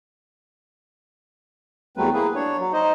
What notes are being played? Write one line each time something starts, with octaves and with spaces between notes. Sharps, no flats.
E2 F#3 G3 A3 C4 B4
A#3 E4 G#4 B4
D4 C#5
F#3
D#4 C5 D#5